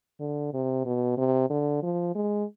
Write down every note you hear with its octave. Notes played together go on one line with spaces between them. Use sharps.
D3
C3
B2
C3
D3
F3
G#3